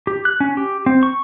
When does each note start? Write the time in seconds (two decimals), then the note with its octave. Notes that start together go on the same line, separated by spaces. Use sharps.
0.07 G4
0.25 F#6
0.40 C#4
0.57 G4
0.86 C4
1.03 C#6